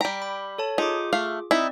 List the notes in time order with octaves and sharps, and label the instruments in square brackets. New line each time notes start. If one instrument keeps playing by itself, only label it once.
[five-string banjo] G3 A#5 [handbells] G5 B6 D7
[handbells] B5
A4 C#5 A5
[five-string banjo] D#4 [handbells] F4 G#4 D6
[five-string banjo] A3 F5
[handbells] C4 D5 [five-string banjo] D#4 E4